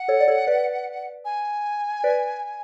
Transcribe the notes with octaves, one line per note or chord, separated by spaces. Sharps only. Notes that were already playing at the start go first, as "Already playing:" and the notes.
Already playing: F#5
A4 C#5
D5
A4 C#5
B4 D5
G#5
B4 D5